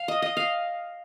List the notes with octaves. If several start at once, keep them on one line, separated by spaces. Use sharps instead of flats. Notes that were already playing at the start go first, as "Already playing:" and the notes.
Already playing: F5
D#5
D#5
F5